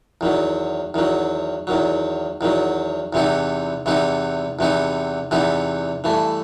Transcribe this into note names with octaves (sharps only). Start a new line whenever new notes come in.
E2 D#3 F#3
E2 D#3 F#3
E2 D#3 F#3
E2 D#3 F#3
E2 C3 E3 B3 D#4
E2 C3 E3 B3 D#4
E2 C3 E3 B3 D#4
E2 C3 E3 B3 D#4
G2 E3 A3